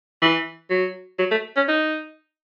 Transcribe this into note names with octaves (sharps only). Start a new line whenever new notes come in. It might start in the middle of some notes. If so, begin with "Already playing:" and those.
E3
F#3
F#3
A3
C#4
D#4